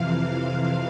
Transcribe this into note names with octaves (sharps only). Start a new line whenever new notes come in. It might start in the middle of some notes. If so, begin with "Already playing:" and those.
Already playing: F2 C3 E3 F5